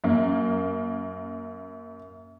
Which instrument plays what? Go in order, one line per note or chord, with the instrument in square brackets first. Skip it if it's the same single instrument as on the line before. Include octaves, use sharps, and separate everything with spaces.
[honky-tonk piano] F#2 A#3